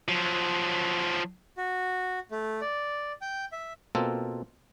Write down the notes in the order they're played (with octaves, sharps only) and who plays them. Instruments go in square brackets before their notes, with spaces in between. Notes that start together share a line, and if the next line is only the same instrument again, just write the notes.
[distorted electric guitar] F3 F#3
[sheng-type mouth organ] F#4
A3
D5
G5
E5
[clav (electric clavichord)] B2 A#3 C4 F4 A4